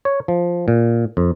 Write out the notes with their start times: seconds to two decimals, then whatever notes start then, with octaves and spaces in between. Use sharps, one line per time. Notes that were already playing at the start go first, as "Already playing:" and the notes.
0.05 C#5
0.28 F3
0.68 A#2
1.17 F2